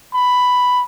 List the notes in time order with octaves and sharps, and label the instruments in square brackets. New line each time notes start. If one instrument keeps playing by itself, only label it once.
[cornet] B5